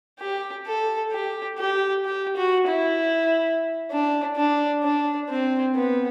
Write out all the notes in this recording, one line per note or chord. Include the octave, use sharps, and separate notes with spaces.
G4
A4
G4
G4
G4
F#4
E4
D4
D4
D4
C4
B3